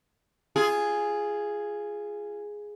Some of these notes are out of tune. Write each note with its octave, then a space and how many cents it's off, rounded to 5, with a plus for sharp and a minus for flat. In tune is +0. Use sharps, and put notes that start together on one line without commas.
F4 -20 G#4 +0